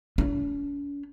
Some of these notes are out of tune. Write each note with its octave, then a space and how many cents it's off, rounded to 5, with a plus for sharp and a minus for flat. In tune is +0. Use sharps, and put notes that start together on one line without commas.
C#4 +45